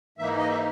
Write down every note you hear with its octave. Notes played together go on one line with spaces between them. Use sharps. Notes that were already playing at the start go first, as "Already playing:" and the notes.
G#2 E3 A#3 D#4 E5
D#5
E5